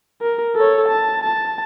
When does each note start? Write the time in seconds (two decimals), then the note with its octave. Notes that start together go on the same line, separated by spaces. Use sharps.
0.22 A#4
0.56 A4 C#5
0.88 A5
1.23 A5